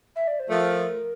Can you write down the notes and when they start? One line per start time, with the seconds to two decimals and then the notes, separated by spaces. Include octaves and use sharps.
0.16 E5
0.28 D5
0.39 C5
0.50 F3 A3 A#4